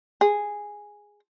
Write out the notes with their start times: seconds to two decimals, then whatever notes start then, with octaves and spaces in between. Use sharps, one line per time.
0.21 G#4